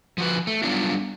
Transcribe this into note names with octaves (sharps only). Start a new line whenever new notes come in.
F3 F#4 B4
A3
F#3 G3 B3 D4 F4 F#4